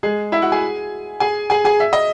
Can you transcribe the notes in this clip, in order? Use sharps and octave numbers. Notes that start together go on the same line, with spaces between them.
G#3 G#4
E4 E5
F#4 F#5
G#4 G#5
G#4 G#5
G#4 G#5
G#4 G#5
E5
D#5